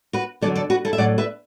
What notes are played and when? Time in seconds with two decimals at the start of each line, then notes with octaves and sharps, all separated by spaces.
0.13 F#4 B4
0.41 E2 D3 F#3 A4 D5
0.56 A4 D5
0.70 F#4 B4
0.85 E4 A4
0.93 E5
0.98 A2 F#3 D5 F#5
1.18 B4 E5